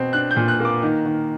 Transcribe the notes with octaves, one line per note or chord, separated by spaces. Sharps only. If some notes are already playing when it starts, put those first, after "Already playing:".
Already playing: B2 C4
D4 F#6
G6
A#2
F#6
A#3 D6
D#3
D#3